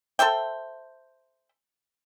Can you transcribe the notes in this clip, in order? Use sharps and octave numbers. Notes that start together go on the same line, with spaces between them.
A4 C5 E5 G5